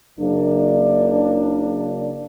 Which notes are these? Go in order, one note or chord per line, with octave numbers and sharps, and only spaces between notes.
F#1 A#3 D4